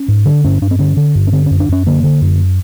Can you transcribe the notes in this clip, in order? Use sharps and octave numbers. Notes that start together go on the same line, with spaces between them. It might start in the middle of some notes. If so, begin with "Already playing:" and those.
Already playing: C#4
G#2
D3 D4
G2 C#4
G2 D4
C4
D3 C#4
D3
G2
C#4
D3 C4
F#2 C#4
D4
F#2 C#4
D3 A#3
D3
F#2